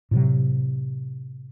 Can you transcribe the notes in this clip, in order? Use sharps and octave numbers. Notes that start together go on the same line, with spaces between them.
A2 C3 F#3